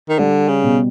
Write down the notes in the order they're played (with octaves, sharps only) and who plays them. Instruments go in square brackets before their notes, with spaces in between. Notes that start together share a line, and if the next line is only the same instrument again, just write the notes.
[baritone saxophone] D#3
[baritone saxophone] D3 [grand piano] G3
[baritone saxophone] C#3
[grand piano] B2